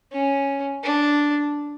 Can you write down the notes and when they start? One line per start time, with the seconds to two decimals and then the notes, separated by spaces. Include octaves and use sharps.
0.12 C#4
0.83 D4